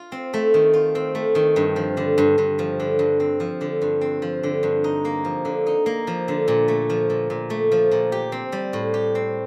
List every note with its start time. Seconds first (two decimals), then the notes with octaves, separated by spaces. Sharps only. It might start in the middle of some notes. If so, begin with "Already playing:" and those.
Already playing: F4
0.12 C4
0.34 A3
0.54 D#3
0.74 F4
0.95 C4
1.15 A3
1.35 D#3
1.56 G2
1.76 F3
1.97 D3
2.18 G2
2.38 G2
2.59 F3
2.80 D3
2.99 G2
3.20 C4
3.40 F3
3.61 D3
3.82 G2
4.01 C4
4.22 F3
4.43 D3
4.63 G2
4.84 D#4
5.05 A#3
5.25 F3
5.45 D3
5.67 D#4
5.86 A#3
6.07 F3
6.28 D3
6.48 A#2
6.68 A3
6.90 F3
7.10 A#2
7.30 A#2
7.50 A3
7.72 F3
7.92 A#2
8.12 G4
8.32 C4
8.52 G3
8.73 A2
8.94 G4
9.15 C4